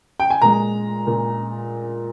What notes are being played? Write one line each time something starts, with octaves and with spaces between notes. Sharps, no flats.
G5
G#5
A#2 G#3 A#5
A#2